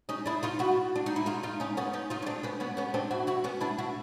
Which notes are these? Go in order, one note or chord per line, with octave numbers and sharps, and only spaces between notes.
C#4 D#4
D4 E4
D#4 F4
E4 F#4
D4
D#4
E4
D#4 F4
D#4 F4
C#4 D#4
B3 C#4
C#4 D#4
D#4 F4
C#4
C4 D4
B3 C#4
B3 C#4
B3 C#4
C4 D4
E4 F#4
E4 F#4
B3 C#4
D4 E4
E4 F#4